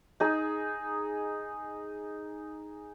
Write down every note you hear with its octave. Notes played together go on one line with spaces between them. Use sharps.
D#4 G#4